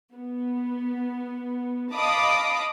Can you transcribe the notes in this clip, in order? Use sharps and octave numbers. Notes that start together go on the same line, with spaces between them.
B3
D#5 F5 A5 B5 D6 D#6